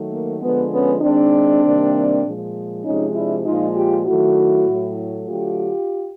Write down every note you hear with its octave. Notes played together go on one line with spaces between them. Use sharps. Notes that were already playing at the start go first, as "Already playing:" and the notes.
Already playing: D#3 F#3 A3
A#3
D3 F3 G#3 B3
B3 C#4
D#3 G#3 C4 D4
C3 D#3 G3 A#3
A#2 F3 G#3
C3 F3 G#3 C#4 D#4
D4 E4
A#2 F3 G#3 D#4 F4
F4 G4
D#3 F#3 A3 E4 F#4
A2 F#3 A3
D3 F#3 A3 F4 G4